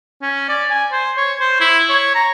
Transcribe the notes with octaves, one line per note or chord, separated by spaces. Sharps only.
C#4
D5
G#5
C5
C#5
C5
E4
C#5
A#5